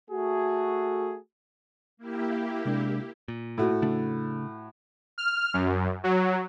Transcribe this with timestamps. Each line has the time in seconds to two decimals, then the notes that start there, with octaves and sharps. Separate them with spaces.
0.10 A3 F#4 G#4
1.97 A#3 E4 G4
2.65 C3 G#3 D4
3.28 A#2
3.58 A2 F#4
3.82 C#3 A3 D4
5.18 F6
5.54 F#2
6.04 F#3